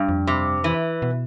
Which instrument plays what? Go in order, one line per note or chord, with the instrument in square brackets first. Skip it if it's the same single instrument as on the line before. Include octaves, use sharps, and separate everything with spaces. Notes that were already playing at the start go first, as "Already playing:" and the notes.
Already playing: [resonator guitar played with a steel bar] G2
[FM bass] F2
[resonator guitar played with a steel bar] C3
E3
[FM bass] B2